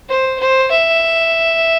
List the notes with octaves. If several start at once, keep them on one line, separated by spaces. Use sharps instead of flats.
C5
C5
E5